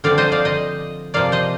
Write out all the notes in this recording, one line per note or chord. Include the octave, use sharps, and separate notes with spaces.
D3 F3 C4 D5 F5
C5 D#5
D5 F5
C5 D#5
C3 F3 A#3 D5 F5
C5 D#5